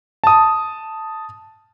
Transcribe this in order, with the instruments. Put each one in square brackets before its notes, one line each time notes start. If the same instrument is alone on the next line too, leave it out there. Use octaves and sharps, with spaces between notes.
[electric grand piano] A5 D#6